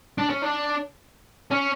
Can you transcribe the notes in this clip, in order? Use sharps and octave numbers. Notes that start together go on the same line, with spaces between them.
D4
C#4
D4
C#4